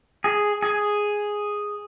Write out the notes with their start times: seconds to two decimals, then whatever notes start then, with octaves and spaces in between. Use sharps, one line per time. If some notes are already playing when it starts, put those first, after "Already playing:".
0.24 G#4
0.62 G#4